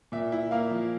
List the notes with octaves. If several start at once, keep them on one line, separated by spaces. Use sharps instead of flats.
A#2 E5
E4
A#3 F5
F3